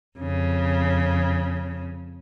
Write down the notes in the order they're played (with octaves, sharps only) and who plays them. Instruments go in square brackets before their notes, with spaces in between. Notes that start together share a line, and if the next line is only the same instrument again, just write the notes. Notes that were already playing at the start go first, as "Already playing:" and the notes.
[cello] F2 C#3